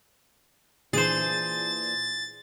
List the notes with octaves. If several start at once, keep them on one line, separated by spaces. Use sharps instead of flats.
A#2 E3 D4 G#4 C5 A6